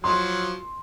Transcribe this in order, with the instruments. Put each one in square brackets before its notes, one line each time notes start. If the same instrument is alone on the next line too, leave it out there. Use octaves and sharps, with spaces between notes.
[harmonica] F3 F#3 [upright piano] C6